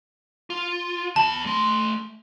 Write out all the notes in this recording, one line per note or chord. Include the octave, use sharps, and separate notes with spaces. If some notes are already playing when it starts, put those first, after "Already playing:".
F4
E2 A5 B5
A3 C6